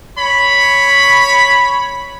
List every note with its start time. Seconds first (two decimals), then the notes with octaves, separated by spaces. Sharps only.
0.17 C#5 B5